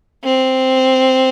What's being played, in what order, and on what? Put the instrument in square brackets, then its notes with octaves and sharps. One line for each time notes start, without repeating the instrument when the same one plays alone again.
[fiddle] C4